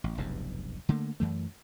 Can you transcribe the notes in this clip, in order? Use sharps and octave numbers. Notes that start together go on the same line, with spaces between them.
A1
F1 B1 E2 G2
D3 A3 A#3
F#2 E3 A3